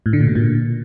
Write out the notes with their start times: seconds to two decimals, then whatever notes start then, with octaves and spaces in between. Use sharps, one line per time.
0.06 A2
0.13 D3
0.21 A#2
0.28 B2
0.35 A#2